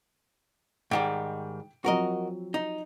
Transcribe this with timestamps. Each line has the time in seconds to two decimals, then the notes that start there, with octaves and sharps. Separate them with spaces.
0.91 G#2 D#3 G3 G5 D7
1.84 F3 F#3 C4 F#4 A#4 D#5
2.54 D#4